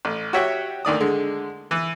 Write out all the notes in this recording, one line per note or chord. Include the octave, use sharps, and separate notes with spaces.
A1
F#4 G4 C#5 E5 F#5 G5
D2 D#3 D5 D#6
D3 G#3
E3